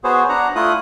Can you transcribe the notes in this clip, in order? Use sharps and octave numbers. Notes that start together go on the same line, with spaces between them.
B3 F#4 G#4 C5 C#5
D4 F#5 A#5
A3 E4 F4 D#6 F#6